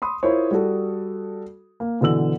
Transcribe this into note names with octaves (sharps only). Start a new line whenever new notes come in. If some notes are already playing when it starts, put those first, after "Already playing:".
B5 C6 D#6
E4 F4 A#4 C5 C#5
G3 F#4 A4
A#3
B2 D3 E3 E6 F#7